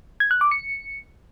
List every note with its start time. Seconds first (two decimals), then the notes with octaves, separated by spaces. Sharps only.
0.20 G#6
0.31 F#6
0.41 D6
0.51 C#7